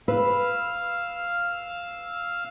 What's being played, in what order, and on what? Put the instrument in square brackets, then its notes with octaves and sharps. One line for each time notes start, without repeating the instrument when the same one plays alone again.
[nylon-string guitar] B4 [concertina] F5 E6 F6